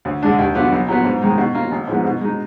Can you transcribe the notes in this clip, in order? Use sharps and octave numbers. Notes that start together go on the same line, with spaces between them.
D2
D3 G#3 D4
D#2
D3 F#3 B3 F4
B1
A#2 F#3 B3
G#2
D#3 G#3 D#4
B2
A#3 F4
G#1
G#2 F3 G#3 B3
B2
G#3 D#4